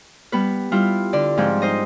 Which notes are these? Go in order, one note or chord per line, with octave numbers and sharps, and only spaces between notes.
G3 B3 B4
G3 E4 F4
D3 D5
G#2 F3 C4
D#4 C5 D#5